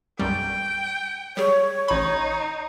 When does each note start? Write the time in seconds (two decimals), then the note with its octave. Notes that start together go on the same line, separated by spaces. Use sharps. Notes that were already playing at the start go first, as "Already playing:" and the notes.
0.19 B1 F#2 G3 G5
1.37 G3 G4 G#4 C#5
1.88 A1 D#4 B5